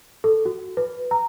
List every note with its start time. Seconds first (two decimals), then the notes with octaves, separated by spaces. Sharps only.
0.24 A4
0.45 F#4
0.77 B4
1.11 A#5